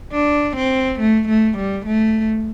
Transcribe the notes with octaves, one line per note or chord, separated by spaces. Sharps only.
D4
C4
A3
A3
G3
A3